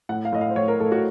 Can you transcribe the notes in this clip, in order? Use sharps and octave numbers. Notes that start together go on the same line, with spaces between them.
A2 F#5
F5
A2 D#5
F5
C5
A2 C#5
A#4
A2 A4
F#4